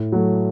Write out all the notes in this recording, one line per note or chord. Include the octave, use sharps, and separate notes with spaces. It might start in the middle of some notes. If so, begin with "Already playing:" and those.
Already playing: A2
F#3 A3